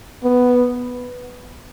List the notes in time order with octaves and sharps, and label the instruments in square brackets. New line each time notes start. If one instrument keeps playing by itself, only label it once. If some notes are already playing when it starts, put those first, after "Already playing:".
[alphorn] B3